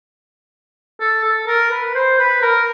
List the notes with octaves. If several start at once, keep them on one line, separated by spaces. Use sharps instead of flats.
A4
A4
A#4
B4
C5
B4
A#4